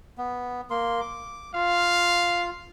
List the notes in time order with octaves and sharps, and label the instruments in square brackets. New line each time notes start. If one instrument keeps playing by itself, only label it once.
[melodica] B3
A#3 A#4 C6
D6
[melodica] F4 [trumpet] F5